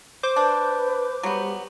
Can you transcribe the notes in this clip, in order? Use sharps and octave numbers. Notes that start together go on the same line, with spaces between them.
C5 D6 G6
D4 B4
F#3 G3 B3